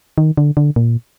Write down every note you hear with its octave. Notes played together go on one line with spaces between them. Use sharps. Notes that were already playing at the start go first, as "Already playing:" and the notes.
D#3
D3
D3
A#2